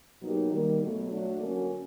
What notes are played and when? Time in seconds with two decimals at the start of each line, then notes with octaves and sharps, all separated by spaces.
0.21 B2 F#3 A#3 D#4 G4
0.51 D#3 G3 A#3
0.81 B2 F#3 A3
1.11 F#3 A3 D4
1.40 D3 F#3 A#3 C#4 F#4